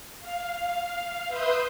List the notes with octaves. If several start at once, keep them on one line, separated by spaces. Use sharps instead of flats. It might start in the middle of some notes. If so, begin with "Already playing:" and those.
F5
B4 E5 C6 D#6 G6